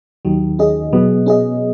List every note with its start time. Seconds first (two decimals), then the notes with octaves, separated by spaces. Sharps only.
0.25 D#2 D#3 F#3
0.59 C#4 G#4 D#5
0.93 B2 F#3 B3
1.26 C#4 G#4 D#5